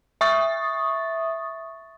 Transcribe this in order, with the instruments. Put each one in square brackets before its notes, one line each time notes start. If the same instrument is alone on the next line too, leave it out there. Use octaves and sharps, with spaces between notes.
[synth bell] E5 C#6 D#6 A6